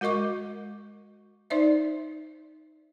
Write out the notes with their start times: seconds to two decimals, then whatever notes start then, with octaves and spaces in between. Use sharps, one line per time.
0.01 G#3 F#4 A#4 D#5 C#6 D6
1.50 D#4 C5 D5 E5